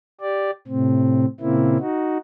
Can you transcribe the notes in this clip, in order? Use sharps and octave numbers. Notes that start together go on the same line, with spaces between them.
G4 D5
A2 C3 C4
A#2 C#3 A#3 C4 E4
D#4 F#4